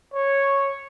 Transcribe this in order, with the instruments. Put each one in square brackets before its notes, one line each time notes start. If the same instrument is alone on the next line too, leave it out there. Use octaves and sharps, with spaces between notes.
[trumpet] C#5